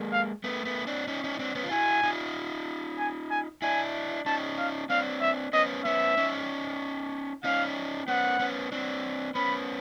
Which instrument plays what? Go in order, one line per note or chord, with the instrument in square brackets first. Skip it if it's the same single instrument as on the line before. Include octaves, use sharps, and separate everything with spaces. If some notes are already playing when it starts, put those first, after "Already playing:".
Already playing: [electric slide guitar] G#3 A#3
[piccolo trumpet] F5
[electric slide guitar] A3 B3
A3 B3
C4 D4
C#4 D#4
C#4 D#4
C4 D4
B3 C#4
F4
[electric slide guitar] E4 F#4 [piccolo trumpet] G#5
[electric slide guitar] D#4 F4
[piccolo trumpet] G#5
G#5
[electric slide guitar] D4 E4 [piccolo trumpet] G#5
[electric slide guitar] C#4 D#4 [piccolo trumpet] A5
[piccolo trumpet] F5
[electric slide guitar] C4 D4 [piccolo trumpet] F5
[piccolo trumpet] E5
[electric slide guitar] B3 C#4 [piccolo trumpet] D#5
[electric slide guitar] B3 C#4 [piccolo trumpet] E5
[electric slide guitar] C#4 D#4
[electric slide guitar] C#4 D#4 [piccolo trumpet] F5
[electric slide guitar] B3 C#4 [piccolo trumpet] F#5
[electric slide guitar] B3 C#4
C4 D4
[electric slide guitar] B3 C#4 [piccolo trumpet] B5